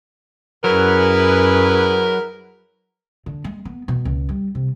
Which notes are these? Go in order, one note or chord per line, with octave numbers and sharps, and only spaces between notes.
F#2 F#3 E4 G#4 A#4 B4
D3
G#3
B3
B2
C#2
G3
C3